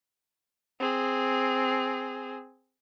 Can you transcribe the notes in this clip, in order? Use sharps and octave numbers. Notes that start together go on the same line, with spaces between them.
C4 G#4